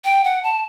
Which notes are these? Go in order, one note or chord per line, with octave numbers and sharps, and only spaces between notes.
G5
F#5
A5